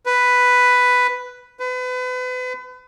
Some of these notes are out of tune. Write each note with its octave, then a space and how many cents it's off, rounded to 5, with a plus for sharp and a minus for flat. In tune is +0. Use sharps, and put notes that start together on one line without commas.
B4 +5
B4 +35